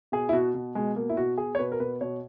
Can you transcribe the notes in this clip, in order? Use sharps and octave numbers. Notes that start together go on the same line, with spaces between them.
B2 G#4
E4
B2 F#4
B2
B2 G#3
B2 A#3
E4
B2 F#4
B2 G#4
C#5
B2 B4
A#4
B2 B4
B2 C#5